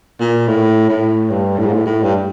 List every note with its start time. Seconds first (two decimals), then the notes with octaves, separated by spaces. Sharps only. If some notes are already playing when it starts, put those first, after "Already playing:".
0.20 A#2
0.48 A2
0.89 A2
1.30 G2
1.58 A2
1.66 G#2
1.74 A2
1.86 A2
2.03 G2